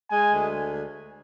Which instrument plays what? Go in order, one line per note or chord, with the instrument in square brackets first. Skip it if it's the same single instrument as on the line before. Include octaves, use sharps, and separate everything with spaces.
[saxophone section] G#3 [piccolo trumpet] G#5
[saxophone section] D2